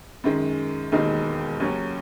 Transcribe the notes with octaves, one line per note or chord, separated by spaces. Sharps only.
F#2 D#3 G#3
E1 D#2 D#3 G#3 D#4
D#2 C#3 F#3 C#4